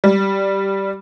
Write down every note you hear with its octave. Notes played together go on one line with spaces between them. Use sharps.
G3